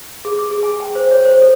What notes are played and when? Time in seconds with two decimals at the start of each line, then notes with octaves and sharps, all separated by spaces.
0.25 G#4
0.39 D6
0.51 G#4
0.63 G#5
0.80 G5
0.95 C5
1.11 C#5
1.25 C5
1.42 A4